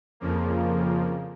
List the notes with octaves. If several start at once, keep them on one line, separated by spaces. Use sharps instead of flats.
F2 C#3 F3 A#3